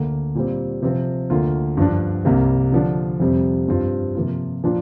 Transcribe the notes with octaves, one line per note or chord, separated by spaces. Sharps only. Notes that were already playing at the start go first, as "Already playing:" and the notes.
Already playing: D2 D3 A#3
A#2 G3 C4
C3 F3 C4
D2 D3 A#3 F4
G2 F3 D4
C2 C3 G3 A#3
D3 F3 D4
F2 C3 G3 C4
G2 G3 C4 F4
C3 F3 A#3 F4
A#2 F3 D4 F4